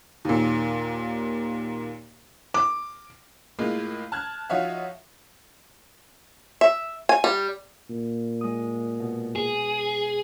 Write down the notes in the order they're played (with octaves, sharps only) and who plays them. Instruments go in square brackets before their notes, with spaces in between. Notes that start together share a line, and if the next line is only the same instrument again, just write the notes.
[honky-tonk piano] D#2 A#2
[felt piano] D6
[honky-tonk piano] A2 G#3 A#3 F4
A5 F6 F#6 G#6
F3 D#4 F#4 C#5 E5 F5
[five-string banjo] E5
G#5
G3
[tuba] A#2
[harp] G#3 D#6
B2
[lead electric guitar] G#4